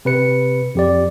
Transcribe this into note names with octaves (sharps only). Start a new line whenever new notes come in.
C3 B4 C#7
F2 G4 D5